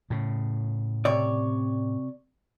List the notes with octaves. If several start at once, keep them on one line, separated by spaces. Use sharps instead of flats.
A2 C#3
C3 C#5 D5